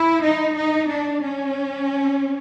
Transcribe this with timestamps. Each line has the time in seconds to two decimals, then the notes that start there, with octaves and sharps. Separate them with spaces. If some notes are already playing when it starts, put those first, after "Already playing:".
Already playing: E4
0.24 D#4
0.57 D#4
0.90 D4
1.24 C#4